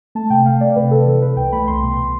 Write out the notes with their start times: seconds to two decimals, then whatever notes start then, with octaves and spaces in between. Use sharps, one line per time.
0.15 A3 A5
0.30 C3 G5
0.46 A3 F5
0.61 A3 D5
0.76 C3 B4
0.91 C3 A4
1.06 E3 A4
1.22 E3 B4
1.37 C2 G5
1.52 A3 B5
1.67 C2 C6
1.83 B2